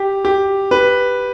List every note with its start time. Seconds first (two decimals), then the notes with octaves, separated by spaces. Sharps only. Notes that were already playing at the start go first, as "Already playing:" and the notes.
Already playing: G4
0.25 G4
0.71 B4